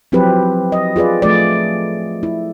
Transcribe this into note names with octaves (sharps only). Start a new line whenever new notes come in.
F3 F#3 C4 E4 G4 B4
D#5
F4 G#4 B4 D5
F3 A3 D5
E4